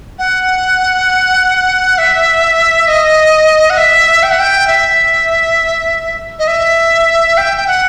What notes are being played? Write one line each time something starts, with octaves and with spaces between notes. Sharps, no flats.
F#5
E5
D#5
F#5
E5
G5
F#5
G5
E5
D#5
E5
G5
G5
F#5